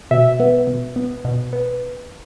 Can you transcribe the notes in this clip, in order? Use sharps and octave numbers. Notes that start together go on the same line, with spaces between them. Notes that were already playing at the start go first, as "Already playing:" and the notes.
B2 E5
B3
B2
B3
B2
B3